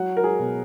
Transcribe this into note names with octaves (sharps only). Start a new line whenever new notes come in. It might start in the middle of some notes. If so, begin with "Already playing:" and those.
Already playing: F#3 F#4
A#4
G#4
B2